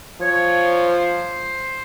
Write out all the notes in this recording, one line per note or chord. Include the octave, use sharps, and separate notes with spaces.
F3 C#5
C5